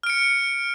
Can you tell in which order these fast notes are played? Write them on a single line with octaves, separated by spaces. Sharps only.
F6 D7 C#7